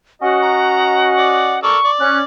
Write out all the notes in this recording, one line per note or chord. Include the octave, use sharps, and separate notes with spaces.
C#4 F#4 D#5 F#5
A#5
D5
A4 A#4 D5 C#6
D5
C#4 F#6